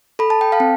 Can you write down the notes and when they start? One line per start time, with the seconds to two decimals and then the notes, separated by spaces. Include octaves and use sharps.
0.19 A4 B5
0.30 A5
0.41 G5
0.52 F5 A5
0.60 C4